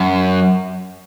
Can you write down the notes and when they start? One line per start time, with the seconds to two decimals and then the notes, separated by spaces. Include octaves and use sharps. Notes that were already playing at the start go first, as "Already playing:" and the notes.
Already playing: F#2